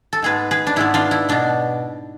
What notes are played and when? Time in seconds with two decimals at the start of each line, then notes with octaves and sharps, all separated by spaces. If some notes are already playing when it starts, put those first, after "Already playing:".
0.13 A4
0.22 G#2 G#3 B3 G#4 B4
0.51 G#4 B4
0.67 D4
0.76 G#2 G#3 B3 E4
0.94 D4 F4
1.11 E4
1.29 B2 B3 D4